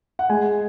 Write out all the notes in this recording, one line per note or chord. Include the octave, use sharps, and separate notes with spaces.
F#5
G#3 G#5